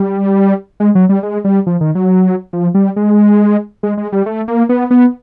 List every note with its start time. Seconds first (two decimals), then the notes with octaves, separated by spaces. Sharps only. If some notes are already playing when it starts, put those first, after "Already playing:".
Already playing: G3
0.80 G#3
0.95 F#3
1.09 G3
1.23 G#3
1.45 G3
1.67 F3
1.81 D#3
1.95 F#3
2.53 F3
2.75 G3
2.96 G#3
3.83 G#3
3.97 G#3
4.12 G3
4.26 A3
4.48 A#3
4.69 B3
4.91 B3